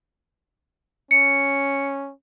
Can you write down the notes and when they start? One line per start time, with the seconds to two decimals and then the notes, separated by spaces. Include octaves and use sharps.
1.11 C#4 C#7